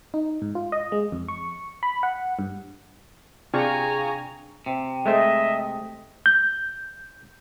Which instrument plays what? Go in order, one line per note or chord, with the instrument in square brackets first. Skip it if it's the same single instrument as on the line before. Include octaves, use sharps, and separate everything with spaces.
[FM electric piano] D#4
G#2
F4
D#5
G#3
F2
C#6
B5
F#5
G2
[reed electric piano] C3 D4 G5 [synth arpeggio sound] F4 G#4 C#6 [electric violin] G#5 A#5
[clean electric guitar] C3
[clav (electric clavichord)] G#3 A3 C5 [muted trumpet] D#5 [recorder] E5
[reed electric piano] G6